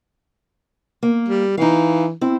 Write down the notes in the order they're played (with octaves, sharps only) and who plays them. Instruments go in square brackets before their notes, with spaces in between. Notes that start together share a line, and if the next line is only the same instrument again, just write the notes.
[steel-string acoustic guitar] A#3
[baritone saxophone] G3
[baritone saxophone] E3 [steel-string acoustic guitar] D#4 F5
[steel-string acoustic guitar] C4 E4